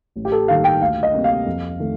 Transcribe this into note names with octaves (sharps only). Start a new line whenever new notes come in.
A1
G4
A4
G2 D#3 A#3 F5
G5
D2 F5
D#5
C3 G3 A#3
F5
F2
D#3 A3